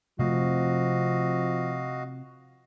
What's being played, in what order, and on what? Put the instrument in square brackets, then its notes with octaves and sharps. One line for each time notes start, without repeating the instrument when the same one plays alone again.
[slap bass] C3 A3 C4 [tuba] F3 [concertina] F#4 D#5 F5